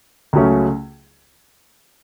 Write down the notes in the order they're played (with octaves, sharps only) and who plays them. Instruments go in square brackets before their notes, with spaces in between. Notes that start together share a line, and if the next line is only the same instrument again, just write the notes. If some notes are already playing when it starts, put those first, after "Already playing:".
[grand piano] C#2 C#3 F#3 A3 C#4